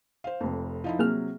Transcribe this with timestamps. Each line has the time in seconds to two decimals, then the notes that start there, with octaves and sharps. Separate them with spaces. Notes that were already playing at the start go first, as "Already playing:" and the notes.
0.24 C5 F5
0.41 F1 F2
0.84 F3 D#4 E4
0.99 C3 F#3 A#3 G#4 F6